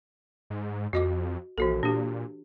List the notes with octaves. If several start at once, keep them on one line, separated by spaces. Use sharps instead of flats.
G#2
F2 F#4 D#5 D6
A#1 E3 F#4 A4
A#2 D4 G4